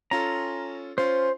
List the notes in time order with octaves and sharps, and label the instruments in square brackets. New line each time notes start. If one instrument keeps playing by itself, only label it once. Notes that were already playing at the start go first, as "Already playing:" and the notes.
[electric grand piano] C#4 F4 A4 [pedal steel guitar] A#5
[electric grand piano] C#4 F4 [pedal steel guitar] C5